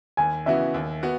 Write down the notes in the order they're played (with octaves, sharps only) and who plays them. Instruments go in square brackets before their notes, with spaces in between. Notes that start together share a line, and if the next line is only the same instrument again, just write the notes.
[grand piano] D#2 [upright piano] G#5
[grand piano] C#3 E3 B3 F#4 [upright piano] E5
[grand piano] D#2
B3 F#4